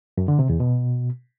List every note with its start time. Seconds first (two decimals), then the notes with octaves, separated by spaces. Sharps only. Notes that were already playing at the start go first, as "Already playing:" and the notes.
0.18 F#2
0.28 D3
0.39 C3
0.49 E2
0.60 B2